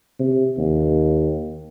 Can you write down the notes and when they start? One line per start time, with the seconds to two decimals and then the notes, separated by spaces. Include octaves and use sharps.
0.20 C3
0.58 D#2